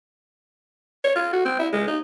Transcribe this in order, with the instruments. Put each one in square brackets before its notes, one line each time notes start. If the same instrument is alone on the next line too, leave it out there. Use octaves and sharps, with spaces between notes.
[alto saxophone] C#5
F4
F#4
C4
E4
G#3
D#4